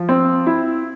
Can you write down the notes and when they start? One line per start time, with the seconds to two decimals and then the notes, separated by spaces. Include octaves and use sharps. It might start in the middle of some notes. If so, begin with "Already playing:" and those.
Already playing: F3
0.09 C4
0.47 E4